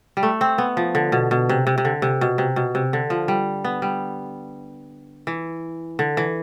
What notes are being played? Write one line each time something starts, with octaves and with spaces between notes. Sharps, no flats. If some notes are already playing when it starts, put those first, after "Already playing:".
G3
A3
C4
B3
F3
D3
B2
B2
C3
C3
C3
D3
C3
B2
C3
B2
C3
D3
F3
G3
B3
G3
E3
D3
E3